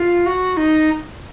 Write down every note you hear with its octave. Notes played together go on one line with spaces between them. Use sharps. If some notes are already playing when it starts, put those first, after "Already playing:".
Already playing: F4
F#4
D#4